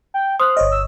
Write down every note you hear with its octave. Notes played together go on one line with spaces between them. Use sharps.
G5
C5 C6 D#6 F6 F#6
G1 C#5 D#5
E6